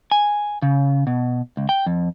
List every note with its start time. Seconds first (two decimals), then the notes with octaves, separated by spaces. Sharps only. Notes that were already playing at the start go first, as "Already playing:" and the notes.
0.11 G#5
0.62 C#3
1.07 B2
1.57 C#2
1.69 G5
1.86 F2